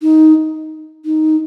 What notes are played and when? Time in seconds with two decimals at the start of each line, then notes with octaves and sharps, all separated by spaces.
0.02 D#4
1.05 D#4